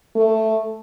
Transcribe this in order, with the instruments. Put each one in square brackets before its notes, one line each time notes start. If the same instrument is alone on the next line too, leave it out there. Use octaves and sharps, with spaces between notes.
[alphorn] A3